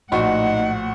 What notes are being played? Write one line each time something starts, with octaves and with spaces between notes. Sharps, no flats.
A#1 A2 D#4 F#4 F#5 C#6